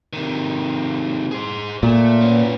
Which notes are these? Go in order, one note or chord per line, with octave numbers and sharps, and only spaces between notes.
C3 D#3
G#4 C5
A#2 A3
B3 C#4